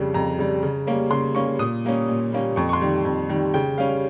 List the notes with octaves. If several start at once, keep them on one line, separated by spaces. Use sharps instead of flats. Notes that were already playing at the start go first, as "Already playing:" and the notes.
Already playing: F2 C#3 G3
F2 A#5
C#3 G3
C#3
G3 A#3 C#4
C#3 C6
G3 A#3 C#4 C#6
A#2 D#6
G3 A#3 C#4
A#2
G3 A#3 C#4
F2 C#6
C#6
C6
D#3 G3
F2
D#3 G3
C#3 G5
G3 C#4 F5